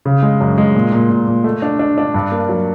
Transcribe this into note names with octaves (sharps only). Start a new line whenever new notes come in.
C#3
G#3
F#2
G#3
A#2
A#2
A#2
A#2
A3
D4
D4
D4
G2
A#3
F#3